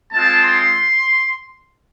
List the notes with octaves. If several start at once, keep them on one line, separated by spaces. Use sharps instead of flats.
G#3 C4 F4 A5
C6